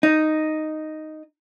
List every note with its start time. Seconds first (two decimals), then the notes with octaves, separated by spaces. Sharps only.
0.03 D#4